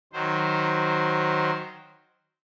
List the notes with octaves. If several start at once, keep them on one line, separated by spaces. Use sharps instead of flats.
D#3 F#3 C5